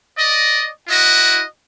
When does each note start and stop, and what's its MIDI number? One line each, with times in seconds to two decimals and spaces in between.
0.18 0.69 74
0.18 0.69 75
0.89 1.43 64
0.89 1.43 66
0.89 1.43 75